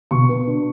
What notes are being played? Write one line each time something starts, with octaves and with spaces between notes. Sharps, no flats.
B2 C#6
B3
D4